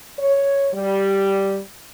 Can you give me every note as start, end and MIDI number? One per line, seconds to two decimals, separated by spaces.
0.18 0.68 73
0.73 1.59 55